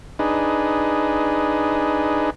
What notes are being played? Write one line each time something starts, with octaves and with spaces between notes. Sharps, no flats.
D4 D#4 G#4 B4